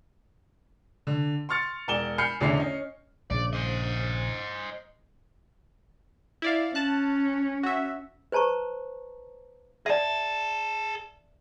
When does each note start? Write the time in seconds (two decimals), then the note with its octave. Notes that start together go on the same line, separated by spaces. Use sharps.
1.07 D3
1.49 C6 C#6 F6 A6 C#7
1.88 E1 A#4 D5 G#5 E7 G7
2.18 G#5 B5 F6 G6 C7 C#7
2.40 A1 E2 D3 C#4 E5 C7
2.57 C#4 D#5
3.30 A#1 C#3 D5
3.53 C5 D#5
6.42 E4 D5 F5
6.75 C#4 A5 F#6
7.63 F#4 E5
8.32 B4 C5 A5 A#5 C#6
9.86 G#4 D5 E5 A5